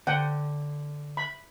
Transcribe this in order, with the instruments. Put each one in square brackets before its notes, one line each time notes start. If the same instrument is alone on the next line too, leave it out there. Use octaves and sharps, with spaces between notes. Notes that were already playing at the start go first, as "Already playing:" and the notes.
[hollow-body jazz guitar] D3 [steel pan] F#5 G5
[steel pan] B5